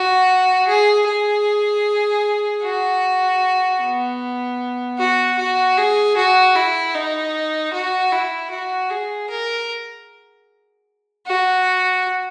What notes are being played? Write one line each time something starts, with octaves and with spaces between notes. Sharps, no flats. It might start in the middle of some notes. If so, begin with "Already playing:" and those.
Already playing: F#4
G#4
G#4
F#4
B3
F#4
F#4
G#4
F#4
E4
D#4
F#4
E4
F#4
G#4
A#4
F#4